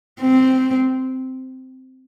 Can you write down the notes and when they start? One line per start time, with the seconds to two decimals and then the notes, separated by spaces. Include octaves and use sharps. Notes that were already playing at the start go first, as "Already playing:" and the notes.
0.21 C4